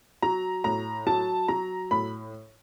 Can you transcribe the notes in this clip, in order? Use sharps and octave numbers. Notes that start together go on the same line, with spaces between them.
F#3 A#5
A2 A#5
F#3 A5
F#3 A#5
A2 B5